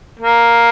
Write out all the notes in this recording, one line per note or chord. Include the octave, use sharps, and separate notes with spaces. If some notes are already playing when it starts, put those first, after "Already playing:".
A#3